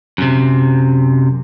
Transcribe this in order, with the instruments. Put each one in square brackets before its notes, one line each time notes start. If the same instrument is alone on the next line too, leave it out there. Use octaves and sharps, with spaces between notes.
[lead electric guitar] F#2 C3